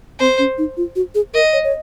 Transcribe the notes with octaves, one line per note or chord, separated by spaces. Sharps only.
C4 C5
C#4
D#4
F4
F#4
G#4
A#4 D#5
C#5
C#5